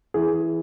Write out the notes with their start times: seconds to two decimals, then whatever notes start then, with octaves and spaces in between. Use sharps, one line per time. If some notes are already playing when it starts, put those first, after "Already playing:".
0.14 E3 G#4